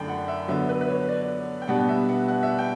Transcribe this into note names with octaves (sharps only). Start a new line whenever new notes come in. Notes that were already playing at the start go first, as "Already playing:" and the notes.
Already playing: F#2 D3 A3 D4 G5 B5
F#5
E5
D3 F#3 B3 D4 E5
B4
B4
C#5
D5
G5
B2 G3 B3 D4 F#5
E5
F#5
F#5
E5
G5